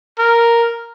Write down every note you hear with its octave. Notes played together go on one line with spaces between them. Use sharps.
A#4